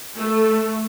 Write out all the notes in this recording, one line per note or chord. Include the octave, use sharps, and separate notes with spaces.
A3